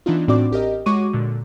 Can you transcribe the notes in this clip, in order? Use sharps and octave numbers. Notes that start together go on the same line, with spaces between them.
E3 B3 D4 D#4 F4
A2 C4 D4 F#4 D5 D6
A1 G4 A#4 D#5
G#3 F#4 C#5 C#6 D6 D#7
A#2 D3